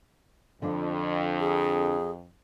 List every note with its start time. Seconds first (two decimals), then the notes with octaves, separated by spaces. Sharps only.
0.62 F2 D3 F3 D4
1.40 G#4